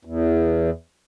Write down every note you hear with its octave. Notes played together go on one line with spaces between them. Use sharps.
E2